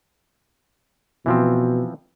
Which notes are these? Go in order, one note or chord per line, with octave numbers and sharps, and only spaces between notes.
B2 E3 F3 C4